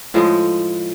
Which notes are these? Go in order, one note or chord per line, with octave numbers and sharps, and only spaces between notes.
A2 F3 G#3